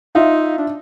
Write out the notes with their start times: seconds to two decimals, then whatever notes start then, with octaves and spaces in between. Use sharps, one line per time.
0.15 D#4 F4 E5 F5
0.58 D4